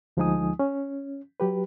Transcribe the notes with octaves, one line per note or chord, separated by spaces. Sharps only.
D2 F3 G#3 D#4 G#5 D#6
C#4
F#3 G4 B4